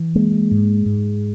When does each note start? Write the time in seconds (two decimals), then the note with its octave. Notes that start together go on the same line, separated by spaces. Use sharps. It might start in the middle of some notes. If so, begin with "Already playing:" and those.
Already playing: E3
0.15 G#3 A#3
0.51 G#2
0.86 G#2